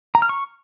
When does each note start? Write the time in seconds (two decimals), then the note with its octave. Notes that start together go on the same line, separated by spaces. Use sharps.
0.15 A#5
0.22 F6
0.29 C#6